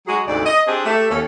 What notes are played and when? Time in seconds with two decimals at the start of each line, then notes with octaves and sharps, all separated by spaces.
0.07 F#3 G#3 F#4 G#4
0.27 D2 G#2 C3 G#3 A4 D5
0.46 D#5
0.67 C4 D4 G4 G#4
0.85 A3 G4 E5
1.11 D#2 C#4 A4